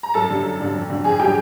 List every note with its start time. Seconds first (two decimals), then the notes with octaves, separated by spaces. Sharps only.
0.03 A#5
0.14 F#2 A4 A5
0.30 D3 G3
0.45 F#2
0.60 D3 G3
0.75 F2
0.90 D3 F#3
1.04 F2 G#4 G#5
1.19 D3 F#3 G4 G5